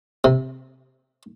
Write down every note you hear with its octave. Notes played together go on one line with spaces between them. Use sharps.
C3